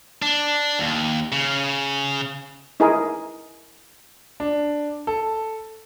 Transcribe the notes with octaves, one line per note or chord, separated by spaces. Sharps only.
D4
D#2
C#3
D#4 E4 G#4 A#4
D4
A4